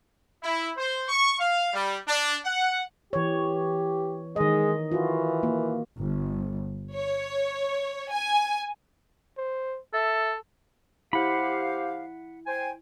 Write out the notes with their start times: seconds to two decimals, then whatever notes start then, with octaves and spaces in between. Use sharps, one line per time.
0.43 E4
0.77 C5
1.09 C#6
1.40 F5
1.73 G3
2.08 D4
2.45 F#5
3.13 E3 G4 C#5
4.36 D#3 G#3 D#5
4.92 E3 F4 F#4
5.43 A#3
5.97 G1
6.95 C#5
8.11 G#5
9.37 C5
9.94 A4 E5
11.13 E4 G4 C5 F5 F#5 B5
12.47 C5 G5 G#5